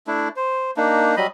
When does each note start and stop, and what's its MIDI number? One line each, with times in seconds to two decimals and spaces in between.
0.07 0.29 57
0.07 0.29 62
0.07 0.29 64
0.36 0.71 72
0.77 1.16 58
0.77 1.16 62
0.77 1.16 63
1.17 1.27 54
1.17 1.27 55
1.17 1.27 75
1.17 1.27 83